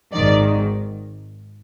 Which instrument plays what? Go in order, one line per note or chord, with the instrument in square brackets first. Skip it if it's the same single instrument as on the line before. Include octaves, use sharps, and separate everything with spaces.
[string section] G#1 G#2 D#3 D5